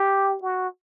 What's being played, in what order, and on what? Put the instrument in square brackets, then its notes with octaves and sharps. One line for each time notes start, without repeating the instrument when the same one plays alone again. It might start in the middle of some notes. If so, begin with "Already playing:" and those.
Already playing: [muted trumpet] G4
F#4